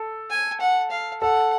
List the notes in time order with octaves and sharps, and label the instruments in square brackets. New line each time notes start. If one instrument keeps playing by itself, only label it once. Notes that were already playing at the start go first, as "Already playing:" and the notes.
Already playing: [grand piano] A4
[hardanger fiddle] G#5
F#5
F5
[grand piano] A4 [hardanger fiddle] F#5